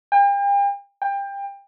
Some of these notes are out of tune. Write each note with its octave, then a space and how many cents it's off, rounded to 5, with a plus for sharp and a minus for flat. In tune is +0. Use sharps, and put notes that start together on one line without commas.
G5 +40
G5 +25